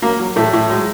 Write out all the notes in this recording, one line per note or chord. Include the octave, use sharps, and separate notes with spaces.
F#3 A#3
F#3
A2 A3
A2
F#3 G#3